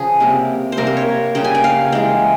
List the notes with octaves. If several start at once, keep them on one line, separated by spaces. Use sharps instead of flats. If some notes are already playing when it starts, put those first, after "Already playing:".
Already playing: C#3 F3 G#4
C3 G3 A#3
C5
C3 G3 A#3 A#4
C5
C#5
C#3 G3 A#3 G5
G#5
G5
F5
E3 G#3 G5